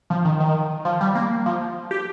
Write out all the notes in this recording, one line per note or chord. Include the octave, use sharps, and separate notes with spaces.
F3
D#3
D#3
F3
G3
A#3
F3
G4